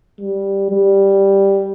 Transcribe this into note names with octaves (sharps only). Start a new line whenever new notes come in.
G3
G3